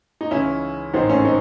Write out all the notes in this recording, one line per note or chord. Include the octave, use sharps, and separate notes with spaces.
D#4
C#2 C#3 E3 C#4 E4
A1 G#2 D#3 C4 D#4
A3 C#4
C4 D#4